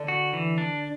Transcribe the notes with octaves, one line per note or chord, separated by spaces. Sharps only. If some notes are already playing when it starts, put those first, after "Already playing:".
Already playing: D3
F#4
E3
D4